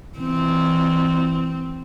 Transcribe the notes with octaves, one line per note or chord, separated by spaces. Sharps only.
E3 C4